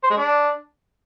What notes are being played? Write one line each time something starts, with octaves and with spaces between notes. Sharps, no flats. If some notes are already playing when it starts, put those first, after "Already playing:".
C5
G#3
D4